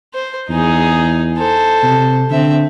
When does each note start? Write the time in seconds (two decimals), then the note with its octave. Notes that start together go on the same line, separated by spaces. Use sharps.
0.14 C5
0.50 E2 D#4 G#4
1.37 A4 C5
1.83 C3
2.30 D3 C4 E5